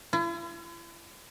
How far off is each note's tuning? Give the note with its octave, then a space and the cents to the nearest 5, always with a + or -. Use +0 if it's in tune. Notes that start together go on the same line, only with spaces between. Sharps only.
E4 +45